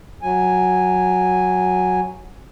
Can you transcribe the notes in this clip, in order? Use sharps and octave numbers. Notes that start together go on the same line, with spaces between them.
F#3 G#5